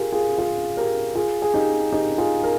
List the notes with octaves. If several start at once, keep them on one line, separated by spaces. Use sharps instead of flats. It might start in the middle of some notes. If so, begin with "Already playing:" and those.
Already playing: F4 G4 G#4 A#4
F4 G#4
F4 G#4
G4 A#4
F4 G#4
G#4
D#4 G4
D#4 G4
F4 G#4
A#4